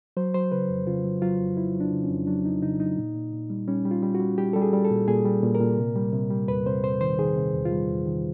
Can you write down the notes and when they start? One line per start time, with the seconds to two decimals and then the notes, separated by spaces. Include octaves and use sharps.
0.17 F#3 C5
0.34 F#3 C5
0.52 C#3 B4
0.69 F2
0.87 C#3 F4
1.04 F#3
1.22 F#3 F4
1.39 F2
1.57 F#3 E4
1.75 F#3
1.80 D4
1.93 C#3
2.04 C#4
2.10 F2
2.27 F#3 D4
2.45 F2 D#4
2.62 C#3 D#4
2.80 F#3 D#4
2.97 A#2
3.15 A#2
3.33 A#2
3.50 G3
3.68 G3 C#4
3.85 G3
3.91 F4
4.03 G3
4.15 F#4
4.20 G3
4.38 G3 G4
4.53 G3 A4
4.62 G#4
4.73 G3
4.84 A4
4.90 A#2
5.08 A#2 G#4
5.25 G3
5.43 A#2
5.55 A#4
5.60 A#2
5.78 C3
5.95 G3
6.13 C3
6.30 G3
6.48 E2 B4
6.66 C3 C5
6.84 C3 C5
7.01 D#3 C5
7.18 D#3 G#4
7.36 C3
7.54 E2
7.65 F4
7.71 G3
7.89 E2
8.06 D#3